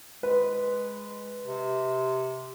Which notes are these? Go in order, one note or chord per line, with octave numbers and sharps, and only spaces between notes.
G#3 B4
C3